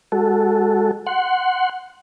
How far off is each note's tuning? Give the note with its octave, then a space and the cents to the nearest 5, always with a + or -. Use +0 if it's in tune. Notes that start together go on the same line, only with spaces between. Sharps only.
G#3 -25 F#4 +0 A4 +0
F#5 +0 C6 +0